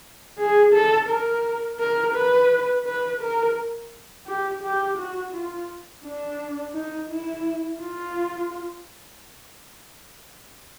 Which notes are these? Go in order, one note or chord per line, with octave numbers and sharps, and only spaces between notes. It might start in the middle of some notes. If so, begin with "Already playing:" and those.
G#4
A4
A#4
A#4
B4
B4
A#4
G4
G4
F#4
F4
D4
D#4
E4
F4